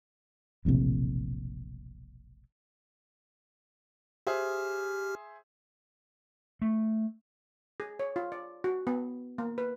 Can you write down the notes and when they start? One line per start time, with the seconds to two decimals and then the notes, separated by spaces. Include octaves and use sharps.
0.65 E1 A#1 A2 C3
4.27 G4 G#4 C5 E5 F6
6.62 A3
7.80 G#4
7.99 C#5
8.16 F4
8.32 D5
8.64 F#4
8.87 B3
9.38 A#3
9.58 B4